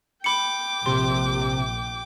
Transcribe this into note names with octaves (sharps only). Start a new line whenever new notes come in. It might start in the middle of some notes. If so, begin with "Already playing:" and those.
G5 B5 D6 C#7
A#1 C3 C6